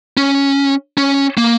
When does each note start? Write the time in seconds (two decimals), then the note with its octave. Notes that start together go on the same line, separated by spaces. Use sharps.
0.17 C#4
0.98 C#4
1.38 A#3